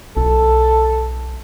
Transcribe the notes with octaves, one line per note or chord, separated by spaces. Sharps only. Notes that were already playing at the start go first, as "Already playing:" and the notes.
B1 A4